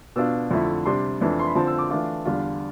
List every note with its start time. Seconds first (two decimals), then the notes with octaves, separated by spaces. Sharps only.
0.16 B2 B3 D4 F4 E6
0.51 F2 D3 F3 A3 E4
0.86 C3 G3 D4 C6
1.21 F2 E3 A3 D4
1.39 C6
1.47 B5
1.55 D3 F3 C4 A5
1.67 E6
1.78 D6
1.90 E3 A3 D4 F4 D6
2.25 E2 D3 G3 D4 F4